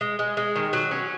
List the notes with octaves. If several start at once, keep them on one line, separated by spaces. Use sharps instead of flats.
G#3
G#3
G#3
D#3
F#3
C#4